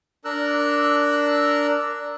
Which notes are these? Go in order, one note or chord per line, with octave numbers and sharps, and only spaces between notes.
D4 A#4 E6 F#6